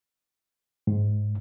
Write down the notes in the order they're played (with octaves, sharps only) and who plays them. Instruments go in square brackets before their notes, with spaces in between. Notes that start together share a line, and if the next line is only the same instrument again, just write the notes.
[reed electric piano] G#2